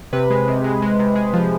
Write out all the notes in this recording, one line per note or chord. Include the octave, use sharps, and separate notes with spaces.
C3 B4
G#3
C3
G#3
G#3
C3
G#3
F3